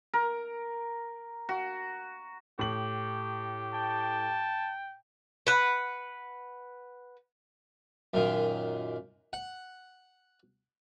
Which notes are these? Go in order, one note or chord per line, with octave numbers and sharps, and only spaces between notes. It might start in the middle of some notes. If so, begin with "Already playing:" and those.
A#4
F#4
A2 G4 F#7
G5 A5
B4 F#5
F#2 A#2 D#3
F#5